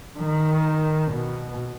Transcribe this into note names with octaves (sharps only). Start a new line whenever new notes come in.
D#3
B2